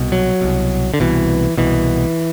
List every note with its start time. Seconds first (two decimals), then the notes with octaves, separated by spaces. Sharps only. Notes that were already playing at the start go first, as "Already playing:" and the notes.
Already playing: C2 B2
0.12 F#3
0.41 C2 B2
0.94 D3
1.00 C2 B2 E3
1.57 C2 B2 E3